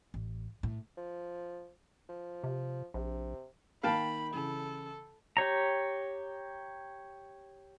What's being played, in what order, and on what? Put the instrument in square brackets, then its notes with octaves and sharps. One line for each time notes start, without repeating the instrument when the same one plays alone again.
[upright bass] A1
A2
[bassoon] F3
F3
[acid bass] C3
[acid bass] A#1 [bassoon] C3
[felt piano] D#3 A#3 [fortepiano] F5 G5 A5 [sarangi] B5
[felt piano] C#3 E3 [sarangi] A4
[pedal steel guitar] G4 C#5 A#5